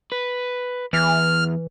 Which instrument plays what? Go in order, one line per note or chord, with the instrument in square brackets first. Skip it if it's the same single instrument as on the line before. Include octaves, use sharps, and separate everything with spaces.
[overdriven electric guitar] B4
[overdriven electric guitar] E2 [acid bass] E3 [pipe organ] F6